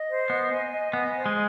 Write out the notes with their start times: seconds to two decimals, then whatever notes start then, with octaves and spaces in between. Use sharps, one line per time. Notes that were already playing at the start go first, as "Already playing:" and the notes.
Already playing: D#5
0.09 C5
0.30 B3 D#5
0.52 G#5
0.72 D#5
0.93 B3 G#5
1.15 C5
1.26 G#3